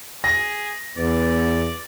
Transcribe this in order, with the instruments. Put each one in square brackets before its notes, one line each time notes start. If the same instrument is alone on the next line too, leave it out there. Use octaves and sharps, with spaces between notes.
[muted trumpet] G#4 [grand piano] A#6
[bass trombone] E2 [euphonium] B3 [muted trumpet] D5